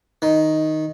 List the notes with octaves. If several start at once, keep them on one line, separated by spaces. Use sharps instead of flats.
D#3